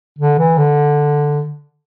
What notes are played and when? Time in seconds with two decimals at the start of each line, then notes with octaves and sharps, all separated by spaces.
0.19 D3
0.39 E3
0.58 D3